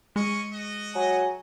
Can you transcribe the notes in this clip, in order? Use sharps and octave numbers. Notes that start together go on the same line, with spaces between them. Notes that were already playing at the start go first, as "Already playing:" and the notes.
G#3 C#4 D#5 C#6
F#4 D#5
F#3 G#5